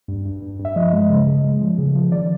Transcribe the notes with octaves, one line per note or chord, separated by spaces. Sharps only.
G2
G2
G2
G2
E5
F3 D#5
G#3
C#3
C#3
G#3
F3
C#3
F3
D#3 D5